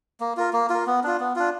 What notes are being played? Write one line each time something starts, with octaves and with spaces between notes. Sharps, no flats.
A#3
F4 A#4
A#3
F4 A#4
B3
D4 F4
B3
D4 F4